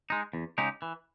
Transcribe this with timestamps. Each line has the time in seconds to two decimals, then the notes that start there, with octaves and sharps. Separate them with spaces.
0.10 G#3 D#4
0.33 E2
0.58 C#3 G#3 D#4 G4
0.82 E3